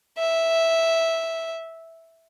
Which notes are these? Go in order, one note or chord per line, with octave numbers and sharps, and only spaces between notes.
E5